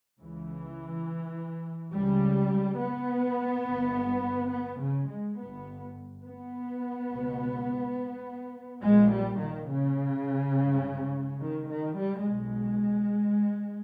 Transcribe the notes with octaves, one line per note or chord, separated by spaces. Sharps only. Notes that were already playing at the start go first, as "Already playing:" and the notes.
C#2 C#3 E3
C#2 C#3 G3
B3
G1 G2
B3
C#3
G#3
G1 G2 B3
B3
C#2 B2
A#1 A#2 G#3
G3
D#3
C#3
G#1 G2
D#3
D#3
G3
B1 B2 G#3